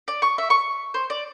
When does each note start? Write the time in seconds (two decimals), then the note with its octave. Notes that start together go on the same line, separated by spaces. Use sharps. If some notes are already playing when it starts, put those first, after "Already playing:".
0.08 D5
0.22 C#6
0.38 E5
0.50 C#6
0.94 C5
1.10 D5